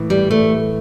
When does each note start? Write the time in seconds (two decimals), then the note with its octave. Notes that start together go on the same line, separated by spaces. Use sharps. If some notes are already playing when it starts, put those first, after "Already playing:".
Already playing: A2 E3
0.10 G3
0.31 A3